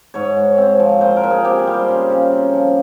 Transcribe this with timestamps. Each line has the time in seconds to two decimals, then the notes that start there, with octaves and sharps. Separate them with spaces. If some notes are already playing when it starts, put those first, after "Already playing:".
0.14 G#2 C#5
0.37 G#2
0.58 C4
0.79 F3
1.01 A#2 C5
1.16 A#4
1.24 A#2
1.30 G#4
1.44 C4 G4
1.59 G#4
1.67 G3
1.74 C5
1.88 C#3
2.10 C#3
2.32 C4
2.53 F3